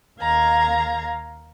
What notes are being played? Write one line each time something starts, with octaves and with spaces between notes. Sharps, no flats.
D#2 F5 A#5 G#6